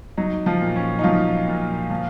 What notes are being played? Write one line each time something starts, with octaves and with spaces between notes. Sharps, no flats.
F#3 D#4
F3 F4
A#2
C#4
D#4
F3 F#3 F4
A#2
F3